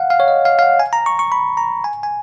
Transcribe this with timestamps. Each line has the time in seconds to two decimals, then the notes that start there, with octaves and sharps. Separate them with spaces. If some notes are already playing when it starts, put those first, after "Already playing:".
Already playing: F5 F#5
0.10 F5
0.20 C#5
0.28 D#5
0.45 F5
0.59 F5
0.63 F#5
0.80 G#5
0.93 A#5
1.06 C#6
1.19 C#6
1.32 B5
1.57 A#5
1.84 G#5
2.03 G#5